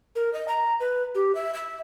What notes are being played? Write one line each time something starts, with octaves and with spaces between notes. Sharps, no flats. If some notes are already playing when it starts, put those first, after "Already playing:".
A#4
D#5
A#5
B4
G4
E5
E5